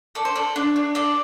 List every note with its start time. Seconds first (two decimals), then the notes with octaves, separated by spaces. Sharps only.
0.15 A4 D5
0.25 C5
0.36 A4 D5
0.56 D4
0.76 D4
0.95 A4 D5